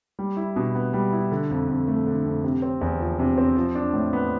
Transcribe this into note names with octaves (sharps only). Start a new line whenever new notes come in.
G3
E4
B2
B3
G3
E4
D3
F2
F2
A3
D3
F2
C3
C4
E2
F3
C3
C4
F3
D4
A2
B3